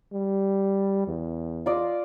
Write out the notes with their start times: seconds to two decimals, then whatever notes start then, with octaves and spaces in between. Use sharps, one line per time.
0.13 G3
1.07 E2
1.66 F4 D5 D#5